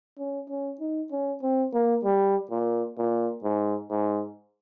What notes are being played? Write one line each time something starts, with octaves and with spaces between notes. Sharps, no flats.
C#4
C#4
D#4
C#4
C4
A#3
G3
A#2
A#2
G#2
G#2